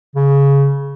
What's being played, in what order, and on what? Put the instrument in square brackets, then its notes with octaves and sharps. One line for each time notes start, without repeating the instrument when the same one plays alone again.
[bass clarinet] C#3